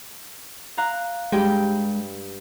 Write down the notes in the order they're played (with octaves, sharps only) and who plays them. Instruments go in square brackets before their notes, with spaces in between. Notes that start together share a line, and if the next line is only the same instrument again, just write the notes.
[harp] F5 A#5 F#6
[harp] G2 G4 G5 [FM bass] G#3